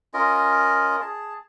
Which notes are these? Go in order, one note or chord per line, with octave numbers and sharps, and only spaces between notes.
C#4 F4 A#4 D#5
G#4 A5